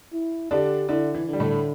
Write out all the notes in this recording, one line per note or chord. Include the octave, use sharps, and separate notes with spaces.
E4
D3 D4 G4
D3 E4
E3
D3
G3
A2 A3